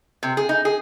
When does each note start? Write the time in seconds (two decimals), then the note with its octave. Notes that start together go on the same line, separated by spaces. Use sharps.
0.23 C3
0.37 G#4
0.49 D#4
0.65 G#4